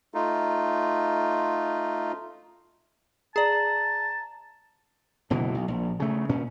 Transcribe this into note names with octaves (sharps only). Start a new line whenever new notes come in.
A3 D#4 F4
G#4 D5 A5 A#5
F#1 B2 D3 E3
B1
A#1
C#3 A3
A#2 C#4